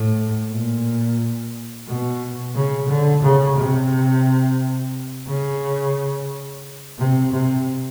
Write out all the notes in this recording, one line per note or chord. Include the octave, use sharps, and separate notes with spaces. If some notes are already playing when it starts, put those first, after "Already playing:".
Already playing: A2
A#2
B2
C#3
D3
C#3
C3
C#3
C3
C3